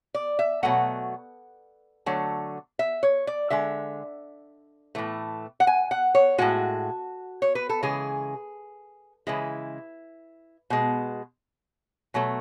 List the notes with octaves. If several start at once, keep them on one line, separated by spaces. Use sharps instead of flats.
D5
E5
B2 F#3 A3 F#5
D3 F#3 A3
E5
C#5
D5
D3 G#3 E5
A2 E3 A3
F#5
G#5
F#5
C#5
A2 E3 G#3 F#4
C#5
B4
A4
C#3 E3 G#3 G#4
C#3 E3 G#3 E4
B2 G#3
B2 F#3 A3